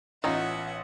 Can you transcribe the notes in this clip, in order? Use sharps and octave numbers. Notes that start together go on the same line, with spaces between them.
A1 B3 C#4 D#4 F4 E5 F#5